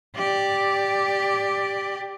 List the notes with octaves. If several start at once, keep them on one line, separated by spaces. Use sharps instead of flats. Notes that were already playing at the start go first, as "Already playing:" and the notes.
G4 D5